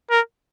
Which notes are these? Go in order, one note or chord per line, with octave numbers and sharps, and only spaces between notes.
A#4